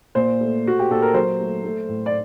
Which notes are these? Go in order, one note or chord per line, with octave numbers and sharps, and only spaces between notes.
A#2 C5
A3
A3 F#4
G4
A#2 A4
A#4
F#3 C5
A3
A3
A2
D5